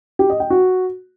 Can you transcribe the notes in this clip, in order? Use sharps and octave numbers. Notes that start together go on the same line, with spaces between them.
G4
D#5
G5
F#4